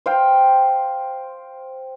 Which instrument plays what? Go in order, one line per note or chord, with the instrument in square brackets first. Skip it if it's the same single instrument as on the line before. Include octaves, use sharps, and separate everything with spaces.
[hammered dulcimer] C5 F5 G5